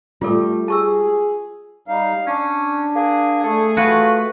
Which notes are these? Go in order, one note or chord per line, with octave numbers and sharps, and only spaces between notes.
G3 A3 F4 A4
G#4 A5 C#6 E6
G3 D#4 F5
C#4 D4
A#3 G#4
A3 A4
F4 F#4 B4